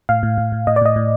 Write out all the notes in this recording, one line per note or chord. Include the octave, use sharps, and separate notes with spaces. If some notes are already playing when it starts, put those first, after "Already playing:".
A2 F5
A2
A2
A2
A2 D#5
D5
A2 D#5
A2